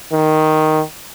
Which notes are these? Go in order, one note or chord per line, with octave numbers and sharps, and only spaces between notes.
D#3